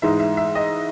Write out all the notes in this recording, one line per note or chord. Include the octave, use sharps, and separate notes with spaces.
G#2 E3 G#3 D#4 E5
E5
E5
D#5